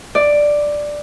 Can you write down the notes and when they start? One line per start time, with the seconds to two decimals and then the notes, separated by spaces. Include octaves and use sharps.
0.15 D5